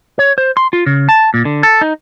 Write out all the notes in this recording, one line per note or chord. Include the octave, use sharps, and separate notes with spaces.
C#5
C5
C6
F4
C#3
A5
A#2
D3
A4
D#4